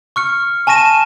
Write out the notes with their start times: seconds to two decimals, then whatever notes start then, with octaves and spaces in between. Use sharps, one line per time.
0.16 C#6 F6 C#7
0.67 G#5 A5 C#6 A#6 D#7 E7